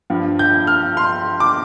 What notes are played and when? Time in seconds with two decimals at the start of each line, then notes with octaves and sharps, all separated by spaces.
0.10 G2 F3
0.39 G6
0.67 F6
0.97 C6
1.40 D6